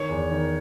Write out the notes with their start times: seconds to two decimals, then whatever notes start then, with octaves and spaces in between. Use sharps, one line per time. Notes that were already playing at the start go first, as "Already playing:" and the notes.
Already playing: D#3 C#5
0.09 E2
0.31 D#3